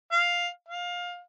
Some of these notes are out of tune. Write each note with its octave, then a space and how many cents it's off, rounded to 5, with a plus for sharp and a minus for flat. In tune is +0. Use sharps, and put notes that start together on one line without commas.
F5 +5
F5 +20